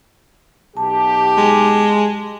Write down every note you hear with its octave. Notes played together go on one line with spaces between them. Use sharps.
B1 D#4 G4 A5
G#3